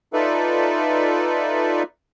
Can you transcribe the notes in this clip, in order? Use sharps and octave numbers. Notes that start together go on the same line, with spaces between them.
D#4 F4 A4 B4 D5 E5